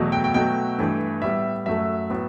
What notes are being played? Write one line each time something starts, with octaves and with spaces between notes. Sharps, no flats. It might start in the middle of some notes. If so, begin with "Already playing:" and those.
Already playing: E2 B2 F#3 A3
G5
G5
B2 F#3 A3 G5
G2 E3 A3
A2 G3 B3 E5
F#2 F#3 A3 E5
A2 F#3 B3